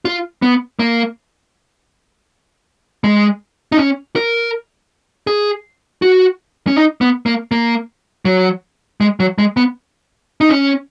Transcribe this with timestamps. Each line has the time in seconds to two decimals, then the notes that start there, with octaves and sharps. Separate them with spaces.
0.05 F4
0.42 B3
0.79 A#3
3.04 G#3
3.72 D#4
3.77 C#4
4.16 A#4
5.27 G#4
6.02 F#4
6.67 C#4
6.76 D#4
7.01 B3
7.26 A#3
7.51 A#3
8.25 F#3
9.01 G#3
9.20 F#3
9.38 G#3
9.57 B3
10.41 D#4
10.49 C#4